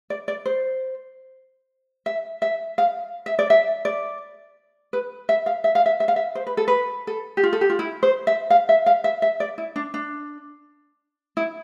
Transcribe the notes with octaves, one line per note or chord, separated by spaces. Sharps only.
D5
D5
C5
E5
E5
F5
E5
D5
E5
D5
B4
E5
F5
E5
F5
E5
E5
F5
E5
C5
B4
A4
B4
A4
G4
F4
A4
G4
F4
E4
C5
E5
F5
E5
F5
E5
E5
D5
E4
D4
D4
E4